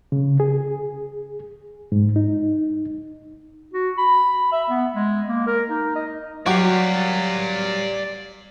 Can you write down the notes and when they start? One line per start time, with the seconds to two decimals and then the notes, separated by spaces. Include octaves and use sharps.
0.12 C#3
0.40 G#4
1.92 G#2
2.16 D#4
3.74 F#4
3.98 B5
4.52 E5
4.70 B3
4.94 G#3
5.28 A#3
5.47 A#4
5.70 D#4
5.96 D#5
6.46 F#3 G3 F#4 G4 D5 F5